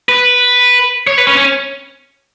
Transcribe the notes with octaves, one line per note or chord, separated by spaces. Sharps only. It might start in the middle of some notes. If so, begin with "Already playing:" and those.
B4
C#5
B4
C#4
C#4